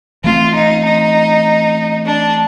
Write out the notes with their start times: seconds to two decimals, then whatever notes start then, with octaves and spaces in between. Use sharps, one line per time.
0.24 E3 A3 C4 F4
0.55 D#4
0.85 D#4
2.06 D4